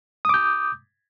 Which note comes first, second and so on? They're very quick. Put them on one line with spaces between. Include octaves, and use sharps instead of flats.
D#6 D6 G6